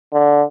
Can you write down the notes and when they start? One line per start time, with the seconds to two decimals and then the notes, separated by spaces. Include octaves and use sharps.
0.13 D3